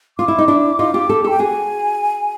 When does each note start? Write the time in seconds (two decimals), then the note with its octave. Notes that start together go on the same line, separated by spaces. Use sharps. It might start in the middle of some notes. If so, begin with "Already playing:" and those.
0.18 F4 D6
0.28 E4
0.38 D#4
0.48 D4 E4
0.79 D#4 F4
0.94 F4 G4
1.09 G4 A4
1.24 G4 A4 G5
1.39 F#4 G#4 G#5